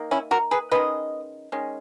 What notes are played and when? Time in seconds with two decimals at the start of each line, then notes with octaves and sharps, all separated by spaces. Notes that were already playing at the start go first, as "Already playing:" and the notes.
Already playing: D#3 A#3
0.11 C#4 E4
0.31 F#4 A#4
0.51 G#4 B4
0.71 D#3 G#3 C#4 B4 D#5
1.52 D#3 G#3 C#4